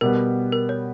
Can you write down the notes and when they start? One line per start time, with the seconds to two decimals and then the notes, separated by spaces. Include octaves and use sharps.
0.01 B2 G3 B3 A#4
0.52 A#4
0.69 C#5